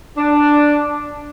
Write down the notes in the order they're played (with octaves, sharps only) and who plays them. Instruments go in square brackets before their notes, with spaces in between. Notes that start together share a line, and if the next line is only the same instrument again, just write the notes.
[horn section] D4